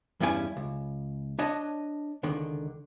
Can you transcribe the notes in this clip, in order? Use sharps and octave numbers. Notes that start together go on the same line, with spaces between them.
E2 G2 C#4 E4 G4 G#5
C#2
D4 C#5 D#5 A5
C#2 D3 D#3